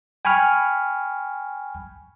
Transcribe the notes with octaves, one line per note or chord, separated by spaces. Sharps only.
G5 G#5 B5 C#6 F6